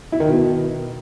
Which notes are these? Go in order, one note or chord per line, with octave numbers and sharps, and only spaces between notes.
E4
D#3
B2